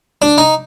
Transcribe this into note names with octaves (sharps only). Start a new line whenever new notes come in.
D4
D#4